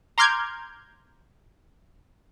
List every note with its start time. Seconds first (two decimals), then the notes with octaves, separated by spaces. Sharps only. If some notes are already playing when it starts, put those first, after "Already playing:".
0.18 A#5 C6 D6 F6 G6 G#6